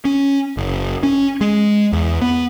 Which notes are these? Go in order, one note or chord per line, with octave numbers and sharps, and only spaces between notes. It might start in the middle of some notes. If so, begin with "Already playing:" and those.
C#4
F#1
C#4
G#3
E2
B3